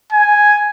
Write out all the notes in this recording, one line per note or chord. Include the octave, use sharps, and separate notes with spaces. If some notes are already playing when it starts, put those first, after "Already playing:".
G#5